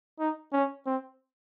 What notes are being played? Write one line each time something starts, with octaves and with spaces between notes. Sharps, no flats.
D#4
C#4
C4